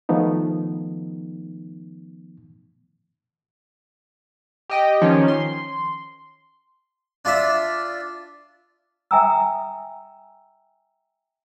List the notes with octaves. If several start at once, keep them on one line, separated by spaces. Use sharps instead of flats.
D#3 F3 A3 B3 D#4
G4 D#5 G5
D#3 F3 C#4
C6
D4 F4 D5 E5
E5 G5 G#5 A#5 D#6 E6